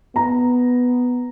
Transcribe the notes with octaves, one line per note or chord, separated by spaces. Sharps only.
B3 A#5